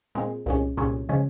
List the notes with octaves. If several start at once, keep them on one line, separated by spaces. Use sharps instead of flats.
A#2 G#3 C4
C2 A#2 G#3 C#4
C2 A#2 G#3 C#4
C#3 F3 G#3 C#4